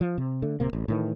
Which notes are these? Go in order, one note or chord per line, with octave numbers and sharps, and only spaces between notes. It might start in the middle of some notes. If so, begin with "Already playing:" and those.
F3
C3
D3 A3
D1 C3 A#3
A1
A2 D#3 E3